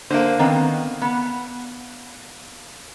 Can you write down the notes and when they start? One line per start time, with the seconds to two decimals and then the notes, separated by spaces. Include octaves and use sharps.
0.11 D3 A#3 C5
0.39 D#3 B3 C4
1.02 B3